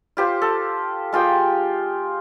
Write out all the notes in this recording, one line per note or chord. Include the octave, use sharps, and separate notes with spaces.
F4 G4 C5
A4
G#3 F4 G4 G5